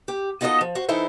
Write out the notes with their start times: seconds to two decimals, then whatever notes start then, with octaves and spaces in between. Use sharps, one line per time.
0.08 G4
0.41 B3 D#4 F4 F#4 A4 D#5
0.61 F3
0.75 F#4 C5
0.88 E3 D#4 E4 A4 C5